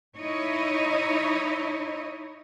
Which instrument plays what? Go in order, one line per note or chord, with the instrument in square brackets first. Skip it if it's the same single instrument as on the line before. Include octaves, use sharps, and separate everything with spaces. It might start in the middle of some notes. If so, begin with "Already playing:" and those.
[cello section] D#4 E4 C#5 D#5